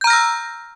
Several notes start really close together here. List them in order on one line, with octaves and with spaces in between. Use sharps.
G6 A#5 F6 A#6 E6